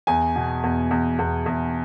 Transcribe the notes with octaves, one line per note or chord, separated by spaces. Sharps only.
E2 G#5
B2
E2
E2
E2
E2